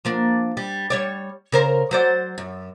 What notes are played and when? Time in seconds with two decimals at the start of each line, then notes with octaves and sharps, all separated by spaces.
0.05 F3 A#3 D4
0.57 G3
0.90 G3 C#5 D5
1.52 C#3 A#4 C5
1.91 F#3 C5 D5
2.38 F#2